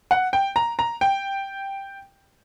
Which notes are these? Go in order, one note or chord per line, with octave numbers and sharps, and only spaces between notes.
F#5
G5
A#5
A#5
G5